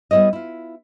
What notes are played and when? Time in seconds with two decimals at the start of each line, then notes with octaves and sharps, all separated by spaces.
0.11 G3 B3 E4 C#5 D#5
0.33 E4 F4